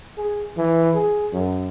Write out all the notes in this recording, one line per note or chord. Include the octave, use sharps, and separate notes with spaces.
G#4
E3
G#4
F#2